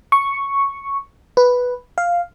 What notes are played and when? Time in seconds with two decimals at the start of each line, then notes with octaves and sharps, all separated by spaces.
0.12 C#6
1.37 B4
1.98 F5